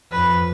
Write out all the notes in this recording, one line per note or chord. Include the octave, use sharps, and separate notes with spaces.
F2 B4